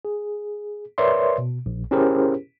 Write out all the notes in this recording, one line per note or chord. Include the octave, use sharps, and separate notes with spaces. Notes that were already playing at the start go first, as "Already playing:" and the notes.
G#4
A#4 B4 C#5 D5 E5 C6
B2
A#1
C#4 E4 G4 G#4 A#4 C5